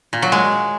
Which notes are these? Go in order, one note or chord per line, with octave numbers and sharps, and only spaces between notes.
A#2
F#3
G#3